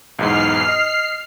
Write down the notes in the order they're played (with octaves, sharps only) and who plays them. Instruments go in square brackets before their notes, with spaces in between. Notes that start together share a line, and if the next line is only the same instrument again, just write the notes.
[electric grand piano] B1 E2 G#2 [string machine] F6 C7
[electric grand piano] D#5